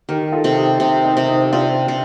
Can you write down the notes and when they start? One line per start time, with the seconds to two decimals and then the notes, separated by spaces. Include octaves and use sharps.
0.09 D#3 G4 A#4
0.32 F4 A4
0.44 C3
0.57 D#4 G4
0.80 C3
1.04 C4 D#4
1.17 C3
1.28 C4 D#4
1.44 G4
1.52 C3 D4 F4
1.88 C3